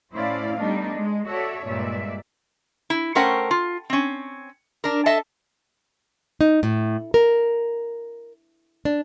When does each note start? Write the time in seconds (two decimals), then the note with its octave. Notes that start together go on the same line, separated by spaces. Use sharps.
0.13 A2 C#4 E4 C5 D5 F5
0.58 G3 A3 B3 D4 D#4
0.95 G#3
1.27 F#4 A4 C#5 D5 E5
1.65 G2 A#2 G#3 D5 E5
2.90 E4
3.15 A3 C#4 A#4 C5 F#5 G5
3.51 F4
3.90 C4 C#4
4.84 D4 A#4
5.06 A4 D#5 E5 A5
6.41 D#4
6.63 A2
7.14 A#4
8.85 D4